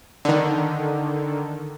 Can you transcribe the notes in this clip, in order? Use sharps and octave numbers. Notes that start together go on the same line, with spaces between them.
D3 D#3